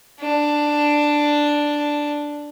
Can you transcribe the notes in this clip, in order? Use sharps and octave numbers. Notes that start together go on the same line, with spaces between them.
D4